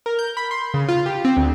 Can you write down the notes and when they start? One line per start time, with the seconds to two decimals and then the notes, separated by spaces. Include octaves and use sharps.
0.06 A#4
0.19 G6
0.37 B5
0.51 C6
0.74 C#3
0.89 F4
1.06 G4
1.25 C4
1.37 D2